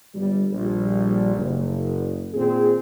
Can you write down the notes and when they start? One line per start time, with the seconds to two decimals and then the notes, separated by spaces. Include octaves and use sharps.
0.14 G1 G3
0.52 A#1 G3
1.35 F#1
2.34 A#2 D#3 C4 G#4